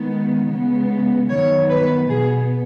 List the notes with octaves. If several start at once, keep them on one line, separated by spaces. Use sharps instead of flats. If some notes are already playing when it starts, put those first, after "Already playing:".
Already playing: D#3 G#3 B3
C#3 G#3 B3
D#3 F#3 B3 C#5
B4
B2 B3 G#4